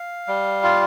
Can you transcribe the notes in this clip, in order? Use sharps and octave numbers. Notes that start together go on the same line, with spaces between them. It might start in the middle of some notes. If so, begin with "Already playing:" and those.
Already playing: F5
G3
F4